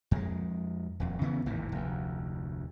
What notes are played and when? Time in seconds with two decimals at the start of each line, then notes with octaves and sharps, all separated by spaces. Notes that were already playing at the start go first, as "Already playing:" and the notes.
0.11 F2 G#3
1.00 D#1 F2
1.22 C#3 E3 B3 C#4
1.46 G#1 D#2 A2 E3
1.72 F1 D2